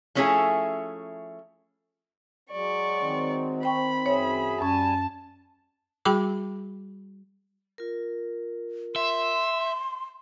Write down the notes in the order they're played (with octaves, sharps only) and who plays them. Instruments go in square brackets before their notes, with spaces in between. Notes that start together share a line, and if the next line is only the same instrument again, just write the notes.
[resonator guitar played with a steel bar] F3 A3 C#4 E4 G#4 A4
[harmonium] F#3 G#3 [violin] D5 C#6
[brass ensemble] D#3 C4
[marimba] C5 G5 C#6 [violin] B5
[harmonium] F#2 G#4 E5 [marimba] C#5
[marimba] F#2 C#4 [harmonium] G3 G#5 [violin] A5
[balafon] G3 F#4 G#4 G5 B5 D6
[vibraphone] F4 A#4
[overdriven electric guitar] E5 [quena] C6